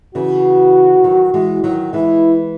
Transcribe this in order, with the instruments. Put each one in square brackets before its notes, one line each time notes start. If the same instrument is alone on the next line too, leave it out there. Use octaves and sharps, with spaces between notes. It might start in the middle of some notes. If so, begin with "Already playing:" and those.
[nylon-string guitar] C#3 E3 [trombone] F#4
[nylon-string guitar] D#3 F#3
E3 G#3
D#3 F#3
[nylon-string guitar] E3 G#3 [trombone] E4